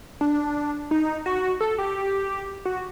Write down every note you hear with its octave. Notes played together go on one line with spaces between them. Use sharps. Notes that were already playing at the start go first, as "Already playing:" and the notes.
D4
D#4
F#4
A4
G4
F#4